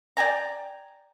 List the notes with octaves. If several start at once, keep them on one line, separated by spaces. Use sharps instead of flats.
D5 G5 G#5 A#5